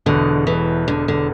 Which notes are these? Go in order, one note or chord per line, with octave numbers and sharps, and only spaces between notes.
E1 E2 B2 D3 B3
E3
D3
D3